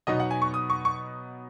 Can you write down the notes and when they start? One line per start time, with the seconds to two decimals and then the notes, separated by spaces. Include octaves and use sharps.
0.07 B2 F#3 B3 D#4 D#5
0.20 F#5
0.31 G#5
0.42 C#6
0.54 D#6
0.70 C#6
0.85 C#6